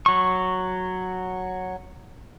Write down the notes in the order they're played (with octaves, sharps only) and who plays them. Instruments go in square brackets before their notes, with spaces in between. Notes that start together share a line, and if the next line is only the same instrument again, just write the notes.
[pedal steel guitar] F#3 C#6